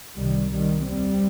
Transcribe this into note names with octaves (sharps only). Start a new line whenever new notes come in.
C2 C3 D#3 G3
C2 C3 D#3 G3
D#2 G3 C4